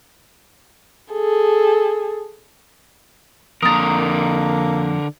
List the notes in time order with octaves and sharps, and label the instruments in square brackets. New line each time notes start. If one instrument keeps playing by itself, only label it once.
[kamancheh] G#4 A4
[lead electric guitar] F2 A#5 [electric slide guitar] D3 A#4 [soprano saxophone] A#3 [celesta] D#6 A6